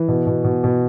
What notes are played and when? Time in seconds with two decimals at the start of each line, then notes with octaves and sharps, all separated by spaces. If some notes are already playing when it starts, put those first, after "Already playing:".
Already playing: E3
0.08 B2
0.27 B2
0.44 B2
0.64 B2